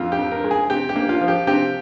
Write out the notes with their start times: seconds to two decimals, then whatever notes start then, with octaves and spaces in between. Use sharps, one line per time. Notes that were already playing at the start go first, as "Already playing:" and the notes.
Already playing: F2 F4
0.12 G4
0.19 F2
0.32 A#4
0.44 G#3
0.51 G#4
0.70 C3 G4
0.89 G4
0.96 A#3
1.09 F4
1.21 F3
1.28 G4
1.47 C3 G4